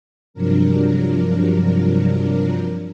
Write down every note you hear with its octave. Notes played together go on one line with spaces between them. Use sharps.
G2 C3 F3 F#3 D4 A#4